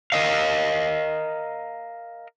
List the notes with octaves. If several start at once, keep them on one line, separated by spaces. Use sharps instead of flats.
A#4 D#5 F5